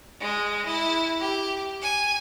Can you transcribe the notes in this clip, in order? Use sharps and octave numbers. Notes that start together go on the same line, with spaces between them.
G#3
E4
G4
G#5